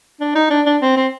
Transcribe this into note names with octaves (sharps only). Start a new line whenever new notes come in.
D4
D#4
D4
D4
C4
C4